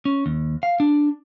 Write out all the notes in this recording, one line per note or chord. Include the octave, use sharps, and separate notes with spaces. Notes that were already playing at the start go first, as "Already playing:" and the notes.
C#4
D#2
F5
D4